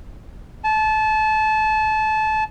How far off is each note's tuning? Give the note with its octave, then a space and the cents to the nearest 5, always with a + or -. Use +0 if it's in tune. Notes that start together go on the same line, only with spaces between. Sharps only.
A5 -25